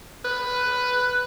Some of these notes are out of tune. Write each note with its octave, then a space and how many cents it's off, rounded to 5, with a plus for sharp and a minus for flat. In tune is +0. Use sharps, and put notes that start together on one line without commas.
B4 +5